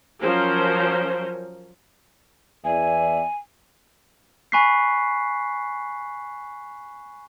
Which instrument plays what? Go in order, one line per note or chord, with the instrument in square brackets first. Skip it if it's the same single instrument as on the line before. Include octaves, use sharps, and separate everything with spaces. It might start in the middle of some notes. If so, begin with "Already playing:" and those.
[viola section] F3 F#3 C#4 A#4 C5
[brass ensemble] E2 D5 E5 [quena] G#5
[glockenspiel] G#5 B5 C#6 F#6 B6 C7